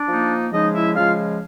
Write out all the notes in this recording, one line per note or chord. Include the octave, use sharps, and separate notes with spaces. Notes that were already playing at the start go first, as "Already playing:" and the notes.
Already playing: D4 D5
F3 A#3 D#4
C#3 F3 G#3 D#4 D#5
E4 E5
C#3 F3 G#3 F4 F5